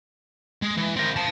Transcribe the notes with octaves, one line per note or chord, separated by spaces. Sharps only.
G#3
E3
C4 A#4
F5 A5